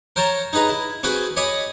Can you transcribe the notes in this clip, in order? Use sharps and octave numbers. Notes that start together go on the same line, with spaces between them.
A#4 C5 C#5 A5 A#5
D#4 G#4 B4 D#5 A#5
E4
C4 F#4 G#4 B4 G5 G#5
C#5 D#5 G#5 B5 D6 D#6